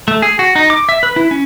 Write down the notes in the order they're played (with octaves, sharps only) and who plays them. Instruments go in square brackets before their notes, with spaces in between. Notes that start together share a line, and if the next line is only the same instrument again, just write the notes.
[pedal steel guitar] A3
G#4
F#4
D#4
D6
E5
B4
E4
C#4